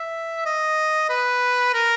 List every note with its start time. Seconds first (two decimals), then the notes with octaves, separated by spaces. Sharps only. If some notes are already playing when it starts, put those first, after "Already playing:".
Already playing: E5
0.46 D#5
1.10 B4
1.74 A#4